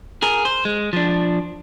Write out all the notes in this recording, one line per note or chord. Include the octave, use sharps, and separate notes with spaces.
G#4 A#4
C5
G#3
F3 D4